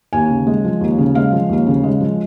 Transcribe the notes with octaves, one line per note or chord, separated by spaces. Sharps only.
D#2 G#5
C#3
G#3
F3
D#2
C#3
G#3 F5
F3
D#2
C#3
G#3
F3